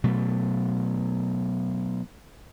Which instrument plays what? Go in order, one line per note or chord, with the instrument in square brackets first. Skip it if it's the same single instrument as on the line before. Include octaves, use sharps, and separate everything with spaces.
[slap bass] B2 F#3 A3